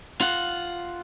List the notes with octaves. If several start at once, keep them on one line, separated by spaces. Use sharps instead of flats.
F4 F#5